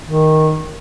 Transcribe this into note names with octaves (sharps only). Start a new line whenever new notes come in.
D#3